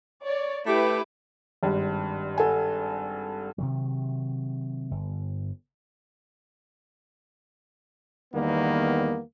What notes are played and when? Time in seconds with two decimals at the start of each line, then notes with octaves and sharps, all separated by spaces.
0.24 C#5 D5
0.67 A3 E4 G4 B4
1.63 G#1 G2
2.38 A4 F#5 G#5
3.58 C3 D#3 F#3
4.91 G1
8.33 E2 D#3 G3 A#3 B3